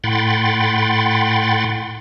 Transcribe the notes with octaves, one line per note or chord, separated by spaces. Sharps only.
A2 F#5 G5 B5 C6 A6